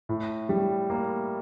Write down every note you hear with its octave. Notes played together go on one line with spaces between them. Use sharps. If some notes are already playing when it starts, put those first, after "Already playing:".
A2
G3
A#3